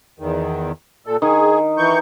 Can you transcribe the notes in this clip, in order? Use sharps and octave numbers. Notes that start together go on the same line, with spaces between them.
E2 D#3
A#2 A4
D#3 G#4
E3 C#6 G6